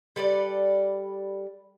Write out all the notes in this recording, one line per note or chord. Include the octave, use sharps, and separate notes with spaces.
G3 A4 B4 D5